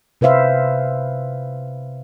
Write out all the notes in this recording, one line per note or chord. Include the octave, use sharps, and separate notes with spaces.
C3 B4 C5 E5 F5